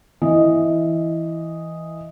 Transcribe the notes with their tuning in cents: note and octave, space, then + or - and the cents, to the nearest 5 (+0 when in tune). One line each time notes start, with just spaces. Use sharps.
E3 +0 D#5 +0